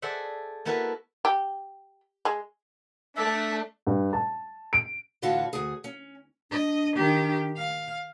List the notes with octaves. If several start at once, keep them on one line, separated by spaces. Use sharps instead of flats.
G#4 A4 C5 D5 E5 F#5
A#3 B3 E4 F#4 A4 B4
G4
G#3
A3 D4 E5
G2
A5
D7
A2 D3 E3 F4 F#4 A5
D2 G#4
C#4
D4 D#5
D#3 G4
F5